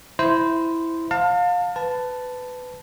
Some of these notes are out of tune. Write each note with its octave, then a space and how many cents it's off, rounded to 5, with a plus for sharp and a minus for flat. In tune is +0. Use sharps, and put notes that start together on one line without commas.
E4 +0 C5 -10
F5 +25 A5 +35
B4 +20 A5 +0